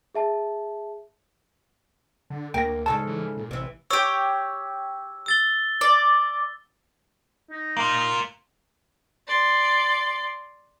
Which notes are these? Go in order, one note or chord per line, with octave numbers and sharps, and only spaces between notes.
G#4 E5 A5
D3
D2 A#3 G5 A#6
G#2 C#3 A4 A5
E3
A#2
A1 C3 E3
G4 C#5 E6
E6 A6 G7
D5
D#4
A#3 F4
D5 C6